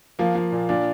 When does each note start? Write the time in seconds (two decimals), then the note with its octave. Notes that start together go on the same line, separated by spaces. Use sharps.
0.19 F3 A#3
0.35 F3
0.52 A#2
0.69 A#2 D4